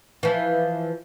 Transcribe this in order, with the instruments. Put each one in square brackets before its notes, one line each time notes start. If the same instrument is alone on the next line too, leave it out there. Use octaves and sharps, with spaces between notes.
[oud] E3 F3